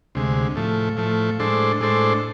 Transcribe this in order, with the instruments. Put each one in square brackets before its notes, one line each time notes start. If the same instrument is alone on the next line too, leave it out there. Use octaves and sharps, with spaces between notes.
[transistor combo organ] D2 C3 G#3
A2 F3 A3
A2 F3 A3
A2 G#3 D4 A4 C5
A2 G#3 D4 A4 C5